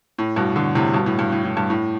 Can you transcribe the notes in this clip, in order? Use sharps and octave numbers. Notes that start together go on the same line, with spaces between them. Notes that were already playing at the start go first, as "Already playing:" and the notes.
A2
G2 B2
B2 D3
A2 C3
G2 B2
A2
G2
A2
A2
G2
A2